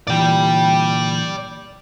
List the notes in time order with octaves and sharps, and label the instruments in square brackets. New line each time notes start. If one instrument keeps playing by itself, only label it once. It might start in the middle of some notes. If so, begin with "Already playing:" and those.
[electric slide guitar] A#2 D3 E3 [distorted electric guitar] D5 G5